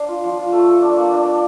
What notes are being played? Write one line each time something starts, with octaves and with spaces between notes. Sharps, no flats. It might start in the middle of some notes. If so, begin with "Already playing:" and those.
Already playing: D4 F5
F4
F3
F4
A3
A4
D4
A#3
D4
D4